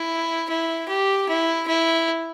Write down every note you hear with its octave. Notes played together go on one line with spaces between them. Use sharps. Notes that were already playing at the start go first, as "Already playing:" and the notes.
Already playing: E4
E4
G4
E4
E4